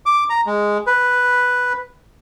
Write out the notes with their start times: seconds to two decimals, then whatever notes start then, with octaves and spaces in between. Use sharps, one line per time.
0.06 D6
0.30 A#5
0.46 G#3
0.87 B4